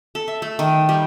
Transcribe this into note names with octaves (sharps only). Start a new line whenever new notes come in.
A4
E5
A3
D#3
G3